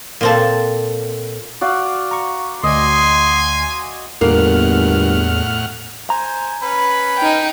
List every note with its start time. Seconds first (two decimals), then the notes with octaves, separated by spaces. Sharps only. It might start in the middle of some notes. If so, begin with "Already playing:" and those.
0.21 A#2 C4 A4
1.61 F#4 D5 F5
2.11 A#5 C#6
2.64 D2 D5 D#5 G#5 C6
4.21 G1 E2 A2 A#3 F#5 F6
6.10 C5 G#5 A#5
6.62 C#4 B4 B5
7.17 D#4 G5